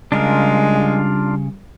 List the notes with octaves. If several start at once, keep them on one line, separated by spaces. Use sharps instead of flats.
C#3 G3 G#3 D4 F4 A#4